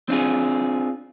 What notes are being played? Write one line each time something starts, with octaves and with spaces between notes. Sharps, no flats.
C4 D4 F4 G#4